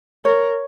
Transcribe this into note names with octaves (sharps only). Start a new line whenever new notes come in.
A#4 C#5